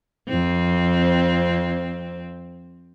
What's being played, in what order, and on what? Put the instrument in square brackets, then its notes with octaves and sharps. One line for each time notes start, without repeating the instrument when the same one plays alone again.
[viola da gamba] F2 C4